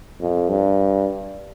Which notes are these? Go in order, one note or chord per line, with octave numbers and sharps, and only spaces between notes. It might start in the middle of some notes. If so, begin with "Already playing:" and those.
F2
G2